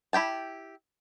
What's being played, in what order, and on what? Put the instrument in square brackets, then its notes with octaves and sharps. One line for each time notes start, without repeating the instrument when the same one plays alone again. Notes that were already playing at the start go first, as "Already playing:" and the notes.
[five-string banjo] E4 G4 G5 A5